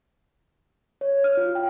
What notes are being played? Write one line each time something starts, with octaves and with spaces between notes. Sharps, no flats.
C#5
F6
F4
G5